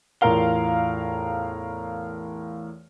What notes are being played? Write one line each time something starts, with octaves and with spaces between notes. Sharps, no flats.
E2 A2 F4 A#4 F5 G7